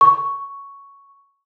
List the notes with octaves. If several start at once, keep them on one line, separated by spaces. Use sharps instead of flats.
C#6